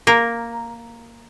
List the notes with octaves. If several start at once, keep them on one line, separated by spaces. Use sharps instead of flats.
A#3 A#4